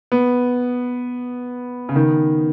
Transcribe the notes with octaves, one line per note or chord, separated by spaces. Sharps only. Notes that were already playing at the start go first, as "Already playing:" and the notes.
B3
C#3
D#3